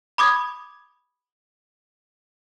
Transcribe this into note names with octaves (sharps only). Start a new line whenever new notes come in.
B5 D6 D#6 G#6